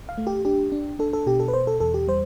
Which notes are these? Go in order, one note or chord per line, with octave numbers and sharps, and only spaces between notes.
F5
A3
G4
D4 G4
D4
D4 A4
A4
B2 G4
A4
B4
B2 C5
A4
E2 A4
G4
G3 C5